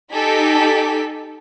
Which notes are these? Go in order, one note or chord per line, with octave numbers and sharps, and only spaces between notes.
D#4 G4 A4 G#5 B6